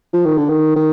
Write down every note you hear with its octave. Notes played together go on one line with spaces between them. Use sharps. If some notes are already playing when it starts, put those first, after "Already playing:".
F3
D#3
D3
D#3
D#3